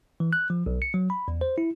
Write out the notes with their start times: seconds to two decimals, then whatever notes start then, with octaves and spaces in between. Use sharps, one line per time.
0.20 E3
0.33 F#6
0.50 F3
0.66 B1
0.82 C#7
0.94 F#3
1.10 B5
1.28 E2
1.41 C5
1.58 E4